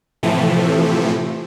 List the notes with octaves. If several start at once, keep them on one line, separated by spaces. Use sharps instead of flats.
A2 C3 E3 F3 A3